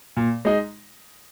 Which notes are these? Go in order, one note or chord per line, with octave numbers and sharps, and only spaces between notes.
A#2
G#3 D#4